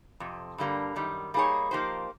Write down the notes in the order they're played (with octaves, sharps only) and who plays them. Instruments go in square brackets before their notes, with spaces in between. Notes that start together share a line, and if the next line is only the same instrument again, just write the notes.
[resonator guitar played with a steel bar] F2 C3
G2 D3 G3 A#3
F#2 D#3 G3
G3 A#3 D#4 G#4 C#5
F3 A#3 D#4 G4 C5